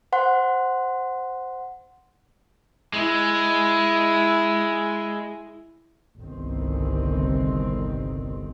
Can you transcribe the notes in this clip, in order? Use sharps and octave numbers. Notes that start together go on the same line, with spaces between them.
C5 F#5 C6
G#3 E4
G1 C2 D#3 C4